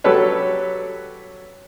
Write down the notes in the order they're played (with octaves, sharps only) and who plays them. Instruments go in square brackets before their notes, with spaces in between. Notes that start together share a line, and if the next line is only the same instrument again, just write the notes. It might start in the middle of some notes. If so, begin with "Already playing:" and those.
[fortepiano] F#3 C#4 G4 A4 B4 C#5